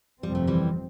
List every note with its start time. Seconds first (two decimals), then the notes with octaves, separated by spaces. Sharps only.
0.23 G1 F2 C3 F3 G3 C4
0.35 A3
0.47 E3 G3